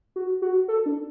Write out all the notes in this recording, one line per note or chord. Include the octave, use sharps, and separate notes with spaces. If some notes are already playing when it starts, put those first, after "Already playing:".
F#4
F#4
A4
D4